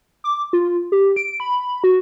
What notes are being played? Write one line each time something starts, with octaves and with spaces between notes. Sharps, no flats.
D6
F4
G4
D7
B5
F#4